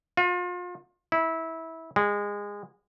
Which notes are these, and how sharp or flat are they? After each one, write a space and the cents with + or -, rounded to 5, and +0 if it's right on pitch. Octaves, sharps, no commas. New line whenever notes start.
F4 +35
E4 -20
G#3 -25